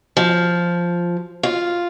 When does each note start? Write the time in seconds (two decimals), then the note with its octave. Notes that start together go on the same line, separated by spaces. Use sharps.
0.17 F3
1.43 F4